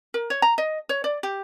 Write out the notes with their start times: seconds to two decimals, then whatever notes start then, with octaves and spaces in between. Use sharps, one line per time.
0.14 A#4
0.30 C#5
0.42 A#5
0.58 D#5
0.89 C#5
1.04 D5
1.23 G4